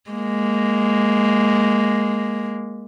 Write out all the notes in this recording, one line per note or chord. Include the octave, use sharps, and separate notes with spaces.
G#3 A#3